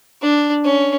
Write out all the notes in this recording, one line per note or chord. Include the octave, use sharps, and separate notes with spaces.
D4
C#4